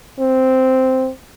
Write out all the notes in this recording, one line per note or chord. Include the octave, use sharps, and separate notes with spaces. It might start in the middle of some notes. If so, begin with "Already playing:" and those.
C4